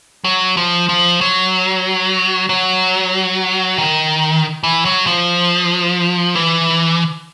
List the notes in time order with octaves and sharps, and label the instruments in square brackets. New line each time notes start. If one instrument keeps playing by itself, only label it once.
[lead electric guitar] F#3
F3
F3
F#3
F#3
D#3
E3
F#3
F3
E3